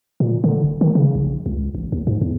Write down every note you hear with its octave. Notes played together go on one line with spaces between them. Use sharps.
A#2
D3
D#1
D#3
C#3
A#1
C#2
A1
D#2
G#2
E2